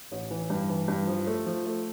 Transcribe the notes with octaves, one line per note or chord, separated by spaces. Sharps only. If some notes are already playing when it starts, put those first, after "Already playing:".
A1
E3
G2
E3
G2
F3
A3
F3
A3